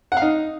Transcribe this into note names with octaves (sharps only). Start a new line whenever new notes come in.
F#5
F5
D#4